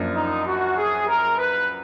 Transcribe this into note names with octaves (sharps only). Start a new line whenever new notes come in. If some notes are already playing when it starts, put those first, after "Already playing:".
Already playing: F#2 F3 A#3 D4
D#4
F#4
G#4
A#4
B4